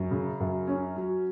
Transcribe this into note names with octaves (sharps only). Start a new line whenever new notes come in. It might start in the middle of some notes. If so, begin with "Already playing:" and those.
Already playing: F#2
C#3
F#2
C#4
F#3